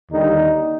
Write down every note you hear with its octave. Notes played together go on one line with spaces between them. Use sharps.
D#2 D3 G3 D#4